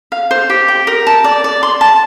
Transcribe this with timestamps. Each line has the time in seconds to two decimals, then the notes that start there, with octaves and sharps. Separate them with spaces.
0.12 F5
0.31 C5
0.50 G4
0.68 G5
0.87 A#4
1.07 A5
1.24 D5
1.44 D5
1.63 C6
1.81 A5